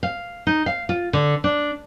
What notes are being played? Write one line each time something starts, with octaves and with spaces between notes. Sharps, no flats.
F5
D#4
F5
F4
D3
D4